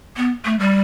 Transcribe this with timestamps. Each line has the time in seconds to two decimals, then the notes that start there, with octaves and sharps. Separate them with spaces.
0.17 B3
0.45 A3
0.60 G3